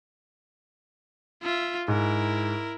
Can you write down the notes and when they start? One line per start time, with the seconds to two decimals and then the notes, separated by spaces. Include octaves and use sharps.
1.42 F4 E5
1.88 G#2 E4 A#4